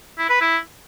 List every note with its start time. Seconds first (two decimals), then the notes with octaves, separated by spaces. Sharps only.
0.18 E4
0.29 B4
0.41 E4